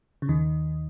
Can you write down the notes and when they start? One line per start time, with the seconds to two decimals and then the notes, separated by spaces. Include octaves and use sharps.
0.22 C#3
0.29 D#2 D#3